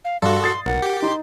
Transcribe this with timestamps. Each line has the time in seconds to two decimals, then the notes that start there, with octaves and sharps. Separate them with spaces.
0.05 F5
0.22 G2 F#4 A4 C6
0.42 D#6 A6 C7
0.66 B1 A#4 F#5
0.82 G4
1.02 D#4 C6